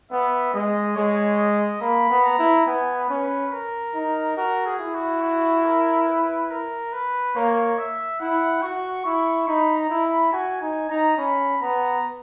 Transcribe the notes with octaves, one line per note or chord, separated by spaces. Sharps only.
B3 E5
G#3 D#5
G#3 C#5
D#5
A#3 B5
B3
A#5
E4
B3 G#5
B4
C#4
B4
A#4
D#4
F#4 A#4
G#4
E4
F#4
F#4
A#4
B4
A#4
B4
A#3 C#5
E5
E4 F#5
F#4 C#6
E4 C#6
D#4 B5
A#5
E4
B5
F#4 G#5
D#4 G#5
D#4 A#5
C#4 B5
B3 A#5